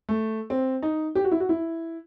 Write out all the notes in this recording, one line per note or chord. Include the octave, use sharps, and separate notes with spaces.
A3
C4
D#4
G4
F#4
E4
F#4
E4